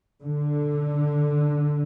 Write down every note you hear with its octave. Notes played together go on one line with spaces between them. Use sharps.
D3